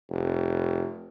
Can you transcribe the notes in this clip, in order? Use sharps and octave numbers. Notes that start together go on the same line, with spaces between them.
F1